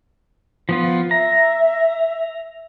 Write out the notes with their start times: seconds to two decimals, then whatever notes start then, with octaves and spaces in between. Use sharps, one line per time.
0.69 F3 B3 F4
1.11 E5 A#5